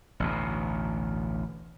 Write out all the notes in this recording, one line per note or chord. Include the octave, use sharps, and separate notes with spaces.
A1 D2 B2